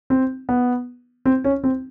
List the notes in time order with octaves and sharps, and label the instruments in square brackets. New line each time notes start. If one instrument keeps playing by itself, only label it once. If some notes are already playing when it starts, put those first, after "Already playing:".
[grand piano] C4
B3
C4
C#4
C4